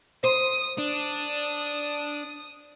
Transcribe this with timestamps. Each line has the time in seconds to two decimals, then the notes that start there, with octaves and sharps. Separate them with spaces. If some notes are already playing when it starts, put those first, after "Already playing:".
0.24 C5 D#6
0.78 D4 D#6